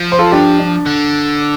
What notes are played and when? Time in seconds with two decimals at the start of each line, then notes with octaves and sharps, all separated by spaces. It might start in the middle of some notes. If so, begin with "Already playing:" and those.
Already playing: F3
0.12 C5
0.19 F4 A4
0.31 D4 G4
0.59 D4
0.86 D3